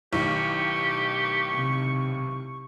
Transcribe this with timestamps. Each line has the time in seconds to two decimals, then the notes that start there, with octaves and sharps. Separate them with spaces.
0.13 B1 A2 D#3 G4 C#6
1.54 C3